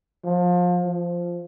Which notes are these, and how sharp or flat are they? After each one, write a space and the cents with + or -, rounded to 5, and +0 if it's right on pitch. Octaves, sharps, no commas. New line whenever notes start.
F3 +30
F3 -5